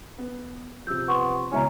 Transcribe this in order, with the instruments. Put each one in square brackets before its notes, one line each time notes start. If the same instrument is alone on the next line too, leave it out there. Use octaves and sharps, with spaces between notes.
[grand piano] B3
[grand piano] C3 F3 [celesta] E6 G6
[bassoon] B3 [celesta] C6 C#6
[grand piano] C#2 B2 G#3 [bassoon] C#4 [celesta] E4 E5 A#5